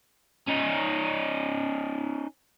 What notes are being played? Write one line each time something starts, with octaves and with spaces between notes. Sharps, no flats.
C#4 D#4